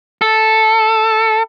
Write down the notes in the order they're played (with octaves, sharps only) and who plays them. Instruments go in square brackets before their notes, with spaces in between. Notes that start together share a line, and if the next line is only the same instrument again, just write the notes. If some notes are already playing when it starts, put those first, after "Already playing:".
[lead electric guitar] A4